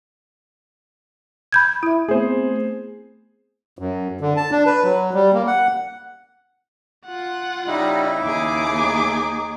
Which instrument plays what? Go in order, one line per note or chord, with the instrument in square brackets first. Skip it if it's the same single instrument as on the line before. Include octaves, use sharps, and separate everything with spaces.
[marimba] B5 G6 G#6
[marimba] E4 [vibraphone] E5 B5
[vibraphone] A3 B3 C4 [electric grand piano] G#4 C5
[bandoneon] F#2
D3
A5
D4
B4
F#3
G3
A#3
F#5
[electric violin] F4 F#5
[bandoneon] C#3 E4 [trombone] G3 [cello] D#4
[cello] D#2 G#4 [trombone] D#4 [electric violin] D6